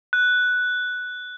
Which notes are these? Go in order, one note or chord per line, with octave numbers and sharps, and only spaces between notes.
F#6